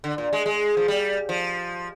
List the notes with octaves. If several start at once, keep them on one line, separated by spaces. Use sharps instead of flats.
D3
A#2
G#3
G#3
F3
G3
F3